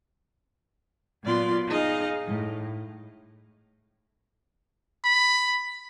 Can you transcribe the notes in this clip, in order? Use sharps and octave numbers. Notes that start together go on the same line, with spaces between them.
A#2 F#3 B3 F4 D5 C6
D#4 G#4 D#5 F5
A2
B5